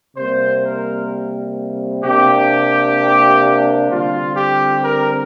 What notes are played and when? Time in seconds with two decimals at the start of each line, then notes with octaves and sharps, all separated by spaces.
0.16 C3 G3 A#3 C5
0.63 A#4
2.03 C3 A#3 D4 G4
3.90 D3 G3 C4 F4
4.36 G4
4.83 A#4